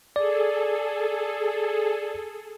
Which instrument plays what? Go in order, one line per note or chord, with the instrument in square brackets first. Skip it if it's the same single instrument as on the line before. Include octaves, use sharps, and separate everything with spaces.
[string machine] G#4 A4 [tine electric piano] D5